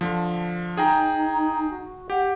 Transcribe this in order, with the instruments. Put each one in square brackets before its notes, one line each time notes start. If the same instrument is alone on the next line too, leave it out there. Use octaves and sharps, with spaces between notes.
[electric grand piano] D3 F3
[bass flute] D#4 [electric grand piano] G#4 G5 A#5
[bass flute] F#4
[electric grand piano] G4 [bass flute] F#5